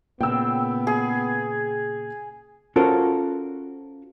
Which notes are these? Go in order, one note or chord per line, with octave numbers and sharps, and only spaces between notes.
A#2 C#3 B3 G5 E6
G#4
C#4 F4 F#4 A4 A#4 C5